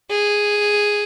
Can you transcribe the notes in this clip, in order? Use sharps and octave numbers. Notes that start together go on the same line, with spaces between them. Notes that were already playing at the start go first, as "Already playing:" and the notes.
G#4